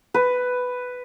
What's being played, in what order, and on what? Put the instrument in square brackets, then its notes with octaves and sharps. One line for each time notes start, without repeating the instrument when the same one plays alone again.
[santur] B4